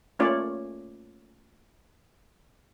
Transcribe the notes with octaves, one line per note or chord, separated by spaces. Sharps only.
A3 A#3 C#4 F4 C#5 D5